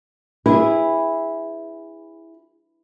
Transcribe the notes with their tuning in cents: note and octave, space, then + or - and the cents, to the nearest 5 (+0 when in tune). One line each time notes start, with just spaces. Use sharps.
E4 +0 G#4 -25 B4 +0